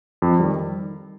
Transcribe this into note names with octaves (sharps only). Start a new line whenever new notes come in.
F2
D#3 G3